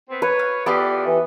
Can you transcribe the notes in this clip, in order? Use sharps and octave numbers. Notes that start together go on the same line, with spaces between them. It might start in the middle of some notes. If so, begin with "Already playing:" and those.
B3 C4
B4 C#5
F5
E2 B3 F4 G4 A4 D5
E3